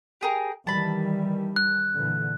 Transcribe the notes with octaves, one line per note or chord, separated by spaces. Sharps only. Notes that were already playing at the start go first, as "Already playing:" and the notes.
G4 G#4 A#4
D#3 E3 G3 A5 B5
F#6
A#2 D3 E3